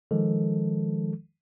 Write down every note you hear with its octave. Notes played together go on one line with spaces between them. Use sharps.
D#3 F3 G#3 A4